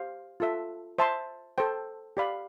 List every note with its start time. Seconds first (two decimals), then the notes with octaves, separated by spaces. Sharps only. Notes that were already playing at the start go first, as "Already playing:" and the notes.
Already playing: G4 C5 F5
0.40 F4 A4 E5
0.98 C5 E5 A5 C6
1.58 A4 C5 G5
2.17 G4 D5 F5 B5